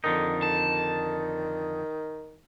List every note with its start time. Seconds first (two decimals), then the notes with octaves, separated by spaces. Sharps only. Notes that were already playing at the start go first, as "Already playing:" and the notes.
0.04 F2 D3 D#3 D#4
0.42 D#3 A5